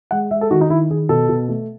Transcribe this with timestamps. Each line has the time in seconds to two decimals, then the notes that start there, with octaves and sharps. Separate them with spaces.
0.11 G#3 F#5
0.31 G#3 E5
0.41 A4
0.51 D#3 F#4
0.61 D#4
0.70 D#3 E4
0.90 D#3 G#4
1.09 B2 A4
1.29 B2
1.49 A3